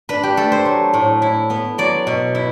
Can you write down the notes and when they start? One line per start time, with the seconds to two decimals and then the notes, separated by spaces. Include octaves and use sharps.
0.09 D4 B4
0.23 G4
0.37 A3 A4
0.52 C5
0.66 F#3
0.93 A2
1.22 E4
1.50 B3
1.78 F#3 D5
2.07 B2
2.35 E4